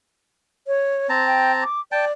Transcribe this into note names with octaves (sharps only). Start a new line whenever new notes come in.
C#5
C4 A5 A#5
G5
D6
D5 G5 A5